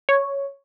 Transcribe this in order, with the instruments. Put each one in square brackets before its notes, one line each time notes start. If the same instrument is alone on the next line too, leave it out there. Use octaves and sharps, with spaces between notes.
[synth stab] C#5